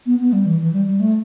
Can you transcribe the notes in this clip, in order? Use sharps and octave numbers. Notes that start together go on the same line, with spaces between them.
B3
B3
G3
E3
E3
G3
G3
A3